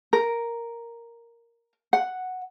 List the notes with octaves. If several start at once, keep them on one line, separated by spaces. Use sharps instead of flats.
A#4
F#5